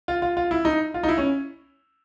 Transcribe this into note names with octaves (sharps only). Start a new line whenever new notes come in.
F4
F4
F4
E4
D#4
F4
D#4
E4
C#4